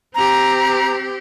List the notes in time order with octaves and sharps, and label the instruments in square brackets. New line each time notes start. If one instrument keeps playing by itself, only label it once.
[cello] C4 G4 [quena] A#5